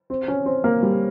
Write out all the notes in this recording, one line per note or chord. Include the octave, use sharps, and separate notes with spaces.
C4
C#4
C4
A#3
G3